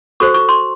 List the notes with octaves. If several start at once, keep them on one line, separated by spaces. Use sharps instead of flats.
F#4 A4 C5 C#6
C#6
C6